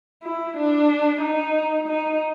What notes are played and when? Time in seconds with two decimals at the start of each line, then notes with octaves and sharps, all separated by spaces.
0.23 E4
0.57 D4
1.21 D#4
1.88 D#4